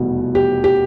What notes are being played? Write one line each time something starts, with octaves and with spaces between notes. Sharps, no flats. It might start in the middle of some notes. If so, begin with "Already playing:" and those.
Already playing: F1 E2 B2 G3
G4
G4